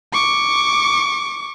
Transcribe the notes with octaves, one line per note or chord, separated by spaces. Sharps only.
C#6 D6